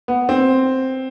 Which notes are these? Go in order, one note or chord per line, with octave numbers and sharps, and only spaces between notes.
B3
C4